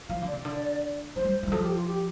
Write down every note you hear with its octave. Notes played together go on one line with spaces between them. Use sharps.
F3 F5
D3
D5
C3
D3
F3 C5
G3
G3
D3
F3 A4
G4
F4
G4